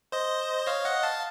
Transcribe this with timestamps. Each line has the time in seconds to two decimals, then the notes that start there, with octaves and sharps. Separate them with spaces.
0.12 C5 D#5
0.67 C#5 F5
0.85 D#5 F#5
1.03 F5 A5